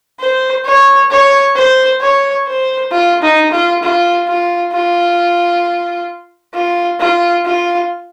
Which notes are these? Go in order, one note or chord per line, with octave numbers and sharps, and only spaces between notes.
C5
C#5
C#5
C5
C#5
C5
F4
D#4
F4
F4
F4
F4
F4
F4
F4